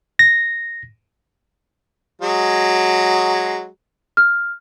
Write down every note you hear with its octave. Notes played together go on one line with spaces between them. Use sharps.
A#6
F#3 G#3
F6